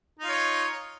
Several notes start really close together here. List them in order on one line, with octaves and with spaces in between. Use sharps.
D#4 F4 C#5